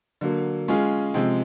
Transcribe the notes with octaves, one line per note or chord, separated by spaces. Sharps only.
D3 F#3 A#3
G#3 C#4 F4 G#4
C3 F3 G#3 C4